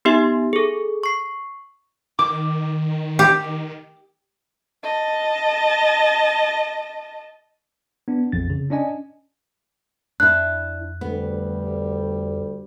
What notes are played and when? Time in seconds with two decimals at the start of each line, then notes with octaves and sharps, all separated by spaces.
0.05 B3 D#4 G4 E5
0.53 G#4 A4
1.03 C#6 C7
2.19 D#3 D6
3.19 G4
4.83 D#5 A5
8.08 B3 D4
8.32 A#1 F2 A6
8.50 C#3
8.70 C#4 D4 D5 D#5 G#5
10.20 F2 D4 E4 F#6
11.01 D2 G3 B3